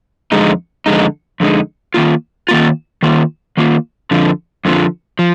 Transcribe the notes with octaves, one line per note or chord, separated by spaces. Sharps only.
F2 D3 G#3 D#4
F2 D3 G#3 D#4
F2 D3 G#3 D#4
D#3 A#3 F4
D#3 A#3 F4
D#3 A#3 F4
D#3 A#3 F4
F2 D3 F3
F2 D3 F3
F3